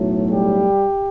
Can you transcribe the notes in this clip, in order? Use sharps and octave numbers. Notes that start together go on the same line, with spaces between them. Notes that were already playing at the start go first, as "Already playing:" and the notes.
Already playing: B1 A2 F#3 A3
G3 G4